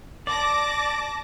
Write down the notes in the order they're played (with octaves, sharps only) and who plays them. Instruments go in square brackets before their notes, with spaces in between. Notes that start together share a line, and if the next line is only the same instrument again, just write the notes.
[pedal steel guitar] D5 [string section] A5 D6 A#6